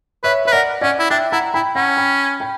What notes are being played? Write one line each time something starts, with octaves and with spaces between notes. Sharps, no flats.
B4 C#5 E5
B4 E5
A#4 D5 F#5
C#4 D5 F#5
E4
D4 E5 G5
E4 F#5 A#5
E4 G5 B5
C#4 F#5 A#5
G5 B5
G5 B5